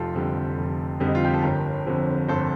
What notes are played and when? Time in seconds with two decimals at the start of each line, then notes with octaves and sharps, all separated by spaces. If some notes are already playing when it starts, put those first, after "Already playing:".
Already playing: F1 F4 G4 A4
0.15 F2 D3 G3
0.58 F1
1.00 F2 D3 G3
1.07 D#4
1.15 F4
1.25 G4
1.34 A4
1.43 G1 G4 A#4
1.87 F2 D3 F3
2.28 G1 A4 C5